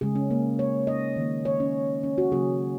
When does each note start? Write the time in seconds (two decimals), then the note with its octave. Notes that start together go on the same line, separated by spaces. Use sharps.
0.01 C#3 G#3 G#4
0.15 C#4
0.30 A#3
0.59 C#5
0.87 D#5
1.16 D#3 A#3
1.45 C#5
1.60 C#4
2.03 C#4
2.18 F#4
2.31 C#3 F#3 A#3 G#4